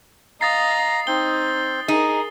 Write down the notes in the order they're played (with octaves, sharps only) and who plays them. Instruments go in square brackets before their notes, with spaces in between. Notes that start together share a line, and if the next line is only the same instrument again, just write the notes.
[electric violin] D#5 F5 [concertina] A#5 [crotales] D#6 A6 C7
[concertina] C4 G5 [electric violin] D#4 [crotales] G7
[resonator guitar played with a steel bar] D#4 [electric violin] G#4 A#4